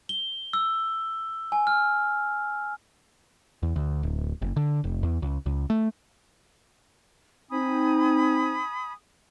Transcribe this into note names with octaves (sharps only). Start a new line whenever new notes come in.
G7
E6
G#5
F6
E2
D2
D1
F#1
D3
F1
E2
C#2
C#2
A3
C4 D#4 G#5 B5 D#6